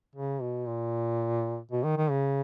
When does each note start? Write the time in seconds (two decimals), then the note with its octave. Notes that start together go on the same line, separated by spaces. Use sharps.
0.15 C#3
0.41 B2
0.68 A#2
1.71 B2
1.84 D#3
1.97 D#3
2.10 C#3